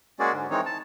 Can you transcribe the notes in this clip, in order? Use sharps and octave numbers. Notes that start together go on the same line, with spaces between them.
G#3 A#3 C#4 F#4 G#4 D5
G#2 D3
D#3 E3 G#3 C4 D#4 C#5
A5